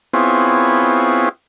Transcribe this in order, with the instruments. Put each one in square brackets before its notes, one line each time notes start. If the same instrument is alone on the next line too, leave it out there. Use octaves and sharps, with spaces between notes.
[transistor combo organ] B3 C4 E4 F4 G#4 C#5